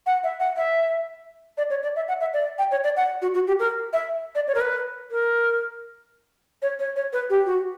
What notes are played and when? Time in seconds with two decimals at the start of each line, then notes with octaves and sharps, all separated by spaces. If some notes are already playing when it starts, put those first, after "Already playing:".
0.06 F#5
0.24 E5
0.40 F#5
0.57 E5
1.58 D5
1.70 C#5
1.83 D5
1.96 E5
2.08 F#5
2.21 E5
2.33 D5
2.59 G5
2.71 C#5
2.84 D5
2.97 F#5
3.22 F#4
3.34 F#4
3.47 G4
3.59 A#4
3.93 E5
4.35 D5
4.48 C#5
4.55 A#4
4.61 B4
5.11 A#4
6.62 C#5
6.79 C#5
6.96 C#5
7.13 B4
7.30 G4
7.46 F#4